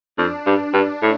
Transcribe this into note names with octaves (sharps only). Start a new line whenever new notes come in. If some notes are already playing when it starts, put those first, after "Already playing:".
F2 D4
G2
G2
A2